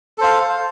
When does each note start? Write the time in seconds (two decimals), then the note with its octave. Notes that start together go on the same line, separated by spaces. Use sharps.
0.18 A4
0.21 C5
0.23 F5